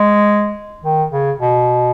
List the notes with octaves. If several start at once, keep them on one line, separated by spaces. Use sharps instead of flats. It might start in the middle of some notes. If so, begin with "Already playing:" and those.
Already playing: G#3
D#3
C#3
B2